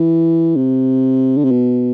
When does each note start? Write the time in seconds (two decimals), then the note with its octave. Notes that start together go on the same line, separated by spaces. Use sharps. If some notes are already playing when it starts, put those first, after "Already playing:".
Already playing: E3
0.56 C3
1.37 D3
1.44 C3
1.51 B2